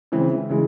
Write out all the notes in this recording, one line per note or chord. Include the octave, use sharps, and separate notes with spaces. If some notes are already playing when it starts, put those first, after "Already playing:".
C#3 E3 G#3 C4
C#3 E3 G#3